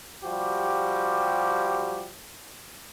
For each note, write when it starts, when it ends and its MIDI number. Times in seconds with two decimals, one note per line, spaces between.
0.24 2.10 53
0.24 2.10 55
0.24 2.10 66
0.24 2.10 67